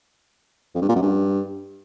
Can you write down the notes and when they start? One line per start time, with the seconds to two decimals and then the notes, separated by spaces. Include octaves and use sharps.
0.75 F2
0.82 G2
0.89 A#2
0.96 F#2
1.03 G2